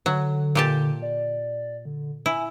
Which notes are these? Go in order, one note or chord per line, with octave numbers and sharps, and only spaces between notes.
D3 F#3
A#2 G4 A5
D5
D3
E4 G#5